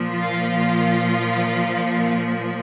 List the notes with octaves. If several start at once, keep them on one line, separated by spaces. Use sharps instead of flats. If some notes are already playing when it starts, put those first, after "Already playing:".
Already playing: A#2 F3
F4